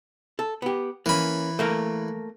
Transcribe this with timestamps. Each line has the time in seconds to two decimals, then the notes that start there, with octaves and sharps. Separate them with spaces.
0.39 A4
0.62 B3 G4
1.06 E3 A#3 C#4 B5
1.59 A3 A#3 A#4